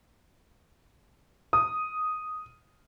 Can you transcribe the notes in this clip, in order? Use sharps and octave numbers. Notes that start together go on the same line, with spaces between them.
D#6